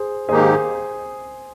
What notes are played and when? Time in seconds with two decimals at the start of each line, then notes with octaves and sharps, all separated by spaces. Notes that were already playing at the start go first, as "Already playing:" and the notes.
Already playing: G#4 C5
0.29 G#2 D#3 A#3 D#4 G4 G#4 C5